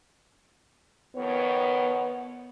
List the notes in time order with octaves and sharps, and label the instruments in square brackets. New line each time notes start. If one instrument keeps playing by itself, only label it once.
[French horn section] F2 D#3 C#5 [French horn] B3